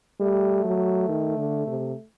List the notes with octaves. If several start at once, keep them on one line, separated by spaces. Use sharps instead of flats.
G3 A3
F#3
D#3
D3
C3